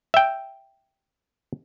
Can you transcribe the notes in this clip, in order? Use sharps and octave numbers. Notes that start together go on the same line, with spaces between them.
E5 G5